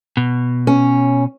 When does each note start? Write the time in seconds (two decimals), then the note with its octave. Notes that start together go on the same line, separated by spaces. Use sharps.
0.17 B2
0.67 C#4